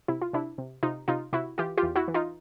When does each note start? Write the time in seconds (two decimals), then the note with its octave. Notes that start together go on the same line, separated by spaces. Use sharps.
0.08 C3 E4
0.22 F4
0.33 C3 D4 E4
0.58 C3
0.83 C3 D#4 F4
1.08 C3 D#4 F4
1.33 C3 E4 F#4
1.58 E3 F4 G4
1.78 F4 G4
1.83 E2
1.96 E4 F#4
2.08 E3
2.14 D#4 F4